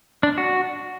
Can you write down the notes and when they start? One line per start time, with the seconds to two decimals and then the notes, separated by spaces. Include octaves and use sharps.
0.23 D4
0.38 F#4